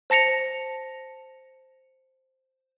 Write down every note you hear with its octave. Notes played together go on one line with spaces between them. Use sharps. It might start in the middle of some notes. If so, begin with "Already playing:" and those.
C5 A5 A#6 C#7 F7